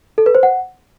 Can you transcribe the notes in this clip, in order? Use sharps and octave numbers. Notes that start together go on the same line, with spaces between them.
A4
B4
C5
F#5